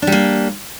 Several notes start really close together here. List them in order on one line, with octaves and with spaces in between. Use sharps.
D4 G3 A#3